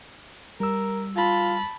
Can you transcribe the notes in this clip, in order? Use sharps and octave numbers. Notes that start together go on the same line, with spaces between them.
G3 A#4 E6
F4 A5 B5